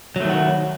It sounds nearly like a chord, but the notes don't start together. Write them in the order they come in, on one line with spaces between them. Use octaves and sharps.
F#3 A3 D#3 F#4